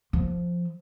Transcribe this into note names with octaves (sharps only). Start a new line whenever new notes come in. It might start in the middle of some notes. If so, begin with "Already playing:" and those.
F3